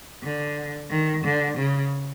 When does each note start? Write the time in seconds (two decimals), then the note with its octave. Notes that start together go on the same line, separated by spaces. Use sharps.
0.23 D3
0.90 D#3
1.25 D3
1.57 C#3